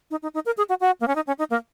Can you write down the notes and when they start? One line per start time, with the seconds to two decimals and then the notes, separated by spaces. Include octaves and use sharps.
0.11 D#4
0.23 D#4
0.34 D#4
0.46 A#4
0.57 G#4
0.69 F#4
0.81 F#4
1.01 A#3
1.08 C#4
1.16 D#4
1.27 C#4
1.39 D#4
1.50 A#3